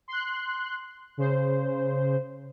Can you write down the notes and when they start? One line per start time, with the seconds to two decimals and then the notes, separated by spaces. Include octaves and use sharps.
0.08 C6 F#6
1.17 C#3 C5